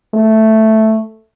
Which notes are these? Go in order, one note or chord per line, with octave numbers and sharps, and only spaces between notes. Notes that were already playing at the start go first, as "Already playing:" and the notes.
A3